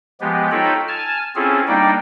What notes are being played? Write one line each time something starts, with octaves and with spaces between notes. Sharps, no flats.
F3 G#3 B3 G4
D#4 F4 A4 C#5 G5 B5
G#5 A5 F6
C4 C#4 E4 F4 G#4 A4
G3 A#3 D4 D#4 D5 G5